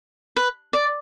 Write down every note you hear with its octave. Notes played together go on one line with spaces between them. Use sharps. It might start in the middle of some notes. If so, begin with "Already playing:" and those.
B4
D5